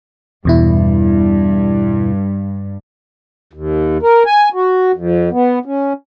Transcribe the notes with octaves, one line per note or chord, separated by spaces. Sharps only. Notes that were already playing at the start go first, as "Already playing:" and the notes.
E2 G2 B2 E4
D#2
A#4
G#5
F#4
F2
B3
C#4